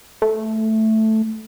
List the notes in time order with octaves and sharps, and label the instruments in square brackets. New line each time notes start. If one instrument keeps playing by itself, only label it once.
[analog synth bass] A3